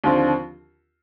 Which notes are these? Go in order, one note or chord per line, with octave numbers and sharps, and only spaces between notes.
D#2 D3 F3 C4 F4